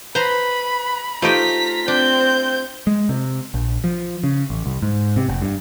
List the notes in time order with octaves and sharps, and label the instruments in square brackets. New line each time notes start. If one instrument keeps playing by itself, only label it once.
[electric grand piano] B4 [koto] C5 A#5 [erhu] B5
[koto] A3 D#4 G4 [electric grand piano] F4 C5 [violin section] A#5 B6
[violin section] C4 [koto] D4 [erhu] G6
[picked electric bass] G#3
C3
A#1
F3
C#3
A1
C2
G#2
C3
F1
G2